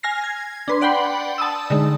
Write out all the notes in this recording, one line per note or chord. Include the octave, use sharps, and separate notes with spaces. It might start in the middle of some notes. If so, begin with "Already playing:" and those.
G#5 F6 A#6 C7
G#6
D4 B4 C6
D5 F#5 G5 B5 C6
A5 D#6 E6
D3 G#3 D#4